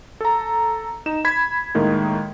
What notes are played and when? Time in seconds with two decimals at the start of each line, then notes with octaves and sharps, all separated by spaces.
0.21 A4 A#5
1.06 D#4 E7
1.25 B5 G#6 B6
1.75 A2 D#3 G#3 A#3